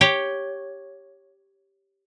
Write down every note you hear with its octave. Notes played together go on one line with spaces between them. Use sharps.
G4 C#5